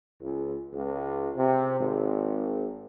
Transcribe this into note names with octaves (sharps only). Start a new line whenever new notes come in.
C#2
C#2
C3
G#1